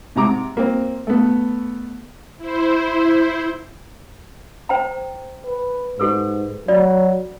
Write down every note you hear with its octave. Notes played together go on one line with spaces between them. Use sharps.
G#2 C3 A#5 D6
A#3 C4
A3 B3
E4 C5
C5 G5 A#5
B4
G#2 G4 A4 B4
F#3 F4 D5